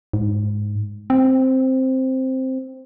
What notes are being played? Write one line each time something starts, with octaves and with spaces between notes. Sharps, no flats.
G#2
C4